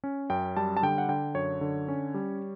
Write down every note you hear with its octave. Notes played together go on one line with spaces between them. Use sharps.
C#4
F#2 G5
G3 A5
A5
D3 G5
F#5
D3 G5
F#2 C#5
D3
C#4
G3